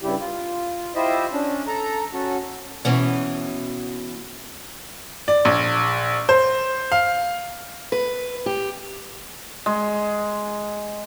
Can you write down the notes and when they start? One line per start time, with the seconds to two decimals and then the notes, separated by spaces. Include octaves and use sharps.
0.01 G2 C#3 G3 E4 G4
0.19 F4
0.95 E4 F4 G4 C5 D#5 E5
1.32 C#4 D4
1.68 A4 A#5
2.13 C#4 F#4 A4
2.85 B2 E3 C#4
5.28 D5
5.45 A#1
6.29 C5
6.92 F5
7.92 B4
8.46 G4
9.66 G#3